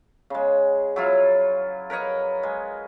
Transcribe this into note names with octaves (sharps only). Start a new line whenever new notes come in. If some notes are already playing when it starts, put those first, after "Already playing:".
C#3 G#3
F#3 E4 F4
A#4 B4 C#5 D#5
G#3